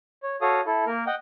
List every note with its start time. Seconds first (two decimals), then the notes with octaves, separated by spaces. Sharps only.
0.23 C#5
0.41 F#4 A4 C#5 F5 D#6
0.66 E4 A4
0.87 A#3 A#4
1.07 D#5 F#5 G5